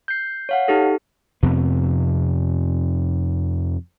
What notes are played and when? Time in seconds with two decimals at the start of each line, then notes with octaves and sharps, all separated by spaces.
0.08 G6 C7
0.49 C#5 F5 F#5
0.68 D#4 G4 A4
1.43 F2 C3 B3